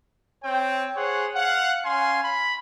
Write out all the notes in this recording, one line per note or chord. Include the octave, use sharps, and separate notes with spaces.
C4 C#5 G5
G#4 C5 C#5 F#5
F5 F#5
C#4 F5 G#5 C6
B5